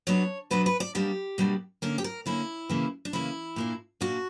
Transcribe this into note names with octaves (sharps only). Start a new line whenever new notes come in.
B2 F#3 B3 D4 C#5
B2 F#3 B3 D4 B4
B4
D5
B2 G3 A#3 D4 G4
B2 G3 A#3 D4
D3 A#3 C#4 A#4
G4
A#4
D3 A#3 C#4 E4
C#3 E3 A#3
D4
C#3 E3 A#3 E4
A#2 A#3 D4
A#2 A#3 D4 F#4